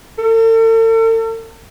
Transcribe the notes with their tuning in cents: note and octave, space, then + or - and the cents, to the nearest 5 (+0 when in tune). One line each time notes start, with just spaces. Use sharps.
A4 +45